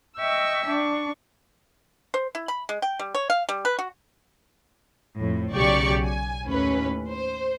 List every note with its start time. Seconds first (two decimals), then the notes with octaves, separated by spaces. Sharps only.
0.17 D#5 E5 G5 C#6 E6
0.68 D4 C#6
2.14 C5
2.35 E4
2.48 B5
2.69 G#3
2.82 G5
2.99 G3
3.15 C#5
3.30 F5
3.49 G3
3.65 B4
3.79 F#4
5.17 F2 A2
5.52 B1 C#3 F#3 G4 D5 C#6
6.05 G#5
6.46 D#2 A2 C#4 B4
7.09 C5